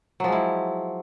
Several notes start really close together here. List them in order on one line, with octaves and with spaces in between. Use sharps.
F#3 F3 G#3 E4